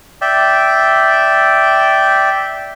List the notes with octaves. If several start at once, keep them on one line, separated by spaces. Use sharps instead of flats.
D5 E5 G5